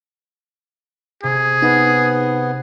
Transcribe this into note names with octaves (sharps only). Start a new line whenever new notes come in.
C3 G#4
B3 D#4